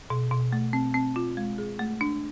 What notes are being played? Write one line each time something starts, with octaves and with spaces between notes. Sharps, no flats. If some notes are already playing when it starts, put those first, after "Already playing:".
B2
B2
A3
C4
C4
F4
G#3
G#4
A3
D4